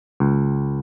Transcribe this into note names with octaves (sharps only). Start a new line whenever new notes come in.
C#2